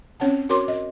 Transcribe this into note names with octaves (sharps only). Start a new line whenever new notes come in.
C4 C#4 C#5 F#5 A5
F#4 A#4 C#5 C6 D6
D#5